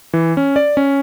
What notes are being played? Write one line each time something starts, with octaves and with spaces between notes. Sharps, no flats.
E3
C#4
D5
C#4